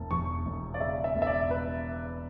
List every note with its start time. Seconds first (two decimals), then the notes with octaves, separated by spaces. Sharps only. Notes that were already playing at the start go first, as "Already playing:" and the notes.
Already playing: E1 A5
0.11 E2 C#6
0.46 E1
0.74 D5
0.80 C#3 E5
1.04 E5
1.15 E1
1.22 E5
1.27 D5
1.51 B4